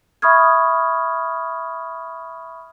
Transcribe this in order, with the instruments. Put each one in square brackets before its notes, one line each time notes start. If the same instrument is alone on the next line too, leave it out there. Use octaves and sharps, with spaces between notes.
[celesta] E5 B5 C#6 D#6 F6 G#6